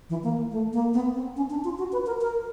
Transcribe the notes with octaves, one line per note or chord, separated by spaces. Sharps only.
E3
A#3
A3
A#3
B3
C4
C#4
D4
F4
F#4
B4
A#4
A#4